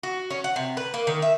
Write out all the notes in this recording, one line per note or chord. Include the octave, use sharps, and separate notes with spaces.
F#4
C#4
F#5
C3
B4
A#3
D#3
E5